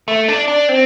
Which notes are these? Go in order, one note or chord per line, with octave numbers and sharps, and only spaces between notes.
A3
D4
D4
C4